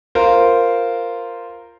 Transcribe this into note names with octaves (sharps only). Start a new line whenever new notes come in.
F4 A#4 C5